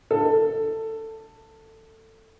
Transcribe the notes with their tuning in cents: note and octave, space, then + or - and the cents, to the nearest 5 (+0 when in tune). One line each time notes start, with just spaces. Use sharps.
A4 +15